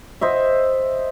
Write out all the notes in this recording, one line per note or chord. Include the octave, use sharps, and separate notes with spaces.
C5 D#5 E5